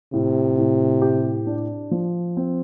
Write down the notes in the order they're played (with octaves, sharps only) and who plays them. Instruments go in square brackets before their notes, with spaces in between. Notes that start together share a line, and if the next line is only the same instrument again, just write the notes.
[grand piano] A2 [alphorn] C3
[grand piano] A2
G4
D4
F3
C4